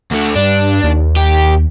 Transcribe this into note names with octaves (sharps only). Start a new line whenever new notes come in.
D2 D3
G2 D4
D#2
G4